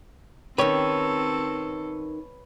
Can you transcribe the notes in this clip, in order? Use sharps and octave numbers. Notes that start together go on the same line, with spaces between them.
D#3 C4 C#4 G4 A4 B4 C#5